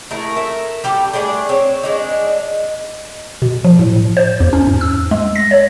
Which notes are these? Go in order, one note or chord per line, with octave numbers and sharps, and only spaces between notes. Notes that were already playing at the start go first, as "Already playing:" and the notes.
A3 E4 G#4 A#4
A4 A#4 E5
G3 G4 A4
A3 D4 G#4 D5
C4 C#5
G#3 D4 D#4
B2
F3
A2
C5
E2
C#4
G#2
E6
G#3
A#6
C#5